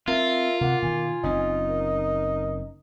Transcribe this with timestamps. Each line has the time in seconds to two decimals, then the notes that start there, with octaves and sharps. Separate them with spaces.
0.08 C4 F4 A#4 E5
0.61 C3 A#3 F#5
0.82 B2 D#3 G#5
1.23 F#1 C4 C#4 D#4
1.67 A#4